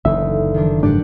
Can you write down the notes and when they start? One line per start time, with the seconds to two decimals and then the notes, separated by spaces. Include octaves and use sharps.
0.05 F#1 D2 E3 D#4 E5
0.54 D#3 F3 D4
0.83 G#2 D4 G4 D5 F#5